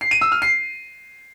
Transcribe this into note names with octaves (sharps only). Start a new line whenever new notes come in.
C7
D#7
E6
F6
C7